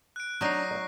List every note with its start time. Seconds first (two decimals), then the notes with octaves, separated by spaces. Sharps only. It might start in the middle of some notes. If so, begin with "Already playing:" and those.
0.16 F#6 D7
0.41 F#3 D4 D#4 C#6 A#6 C7
0.71 D#5 E5